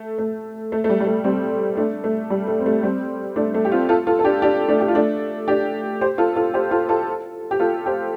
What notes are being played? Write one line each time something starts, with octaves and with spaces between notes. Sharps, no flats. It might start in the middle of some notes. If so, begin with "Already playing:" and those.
Already playing: A3
A3
A3
A3
G3
G3
A3
G3 C4
A3 D4
A3
G3
A3
C4
A3
G3 C4
A3 D4
A3
G4
C4 F4
F4 A4
F4 A4
A4
D4 G4
D4 G4
A3 D4
G4
F4
A3 D4
D4 G4
G4 C5
F4 A4
F4 A4
G4 C5
F4 A4
F4 A4
G4
F4 A4
G4 C5